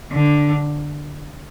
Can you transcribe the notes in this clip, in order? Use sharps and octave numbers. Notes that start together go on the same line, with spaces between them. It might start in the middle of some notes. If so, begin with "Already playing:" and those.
D3